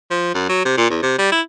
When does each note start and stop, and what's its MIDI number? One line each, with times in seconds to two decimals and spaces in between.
0.11 0.30 53
0.34 0.47 42
0.49 0.65 54
0.65 0.76 48
0.77 0.89 46
0.90 1.01 40
1.03 1.17 48
1.19 1.29 55
1.32 1.41 64